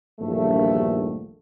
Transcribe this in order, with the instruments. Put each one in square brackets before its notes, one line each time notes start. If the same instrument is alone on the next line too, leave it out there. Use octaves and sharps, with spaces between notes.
[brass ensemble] A#1 E2 G2 D#3 A3